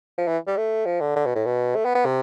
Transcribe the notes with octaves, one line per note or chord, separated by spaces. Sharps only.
F3
E3
G3
A3
F3
D3
D3
B2
A2
B2
A3
B3
B3
C3